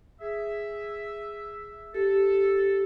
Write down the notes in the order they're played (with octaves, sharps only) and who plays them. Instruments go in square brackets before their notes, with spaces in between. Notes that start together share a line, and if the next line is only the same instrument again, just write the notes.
[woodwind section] G#4 E5
[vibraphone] G4 [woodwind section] A4